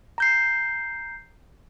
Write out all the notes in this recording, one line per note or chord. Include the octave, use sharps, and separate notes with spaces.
A#5 G6 C7